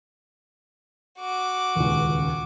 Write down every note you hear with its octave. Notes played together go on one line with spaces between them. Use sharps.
F#4 D6
D#1 C#2